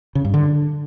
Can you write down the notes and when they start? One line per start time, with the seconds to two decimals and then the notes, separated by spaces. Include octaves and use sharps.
0.15 C#3
0.25 G2
0.34 D3